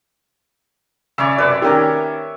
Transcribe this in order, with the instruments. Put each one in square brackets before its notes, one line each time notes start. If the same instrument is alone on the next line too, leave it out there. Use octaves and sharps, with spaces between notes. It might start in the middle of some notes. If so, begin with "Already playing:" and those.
[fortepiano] C#3 [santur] C#5 D5 E5
[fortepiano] F#2 C3 [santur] B4 [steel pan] D5
[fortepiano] D#3 C#4 [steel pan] G4 A#4